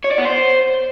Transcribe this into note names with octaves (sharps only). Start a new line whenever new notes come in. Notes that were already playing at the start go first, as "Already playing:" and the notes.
C#5
D5
B3
C5